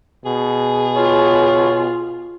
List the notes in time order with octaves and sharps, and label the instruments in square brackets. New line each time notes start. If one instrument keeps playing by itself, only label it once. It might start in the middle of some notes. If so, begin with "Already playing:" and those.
[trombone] B2 [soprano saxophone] G#4
[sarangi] F4 [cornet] C#5